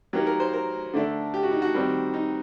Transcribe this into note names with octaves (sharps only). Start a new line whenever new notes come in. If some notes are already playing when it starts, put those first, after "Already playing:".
F#3 A#3 D#4 G4
A#4
C5
A#4
D3 A3 D4
G4
F#4
D#4
F#4
D#3 G3 C4 D#4
D#4